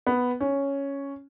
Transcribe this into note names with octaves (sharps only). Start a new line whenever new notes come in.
B3
C#4